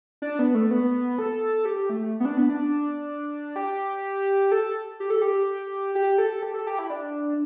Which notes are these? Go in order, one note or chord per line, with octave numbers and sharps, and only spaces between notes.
D4
B3
A3
B3
A4
G4
A3
B3
D4
B3
D4
G4
A4
G4
A4
G4
G4
A4
G4
A4
G4
E4
D4